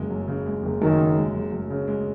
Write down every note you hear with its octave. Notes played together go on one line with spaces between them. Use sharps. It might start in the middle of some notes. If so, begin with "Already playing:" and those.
Already playing: F#1 F#2 C#3 G#3
F#2
C#3
G#3
F#1
F#2 D#3
C#3
G#3
F#1
F#2
C#3
G#3